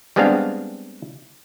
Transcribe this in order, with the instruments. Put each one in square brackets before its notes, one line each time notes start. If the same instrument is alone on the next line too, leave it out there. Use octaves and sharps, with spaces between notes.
[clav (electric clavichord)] G3 G#3 B3 C4 D4 F5